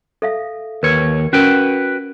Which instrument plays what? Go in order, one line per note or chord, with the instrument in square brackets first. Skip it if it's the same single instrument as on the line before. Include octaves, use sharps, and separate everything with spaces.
[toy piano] A4 E5 F5
[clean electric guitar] D#2 C#5 [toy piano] A#4 B4 C#6
[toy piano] C#4 A#4 [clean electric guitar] F#4 B4 G5